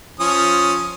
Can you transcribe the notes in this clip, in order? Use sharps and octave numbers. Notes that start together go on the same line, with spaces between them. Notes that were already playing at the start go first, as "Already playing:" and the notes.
F3 C#4 D#6